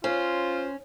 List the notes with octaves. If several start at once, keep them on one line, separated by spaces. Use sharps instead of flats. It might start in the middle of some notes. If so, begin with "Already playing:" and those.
C#4 F4 C5